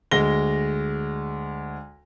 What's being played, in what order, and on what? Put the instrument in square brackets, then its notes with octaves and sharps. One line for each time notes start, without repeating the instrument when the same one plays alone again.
[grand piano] D2 G#3 A#6 G7